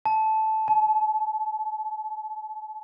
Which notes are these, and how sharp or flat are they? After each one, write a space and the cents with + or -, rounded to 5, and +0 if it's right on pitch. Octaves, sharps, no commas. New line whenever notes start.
A5 -10
A5 -40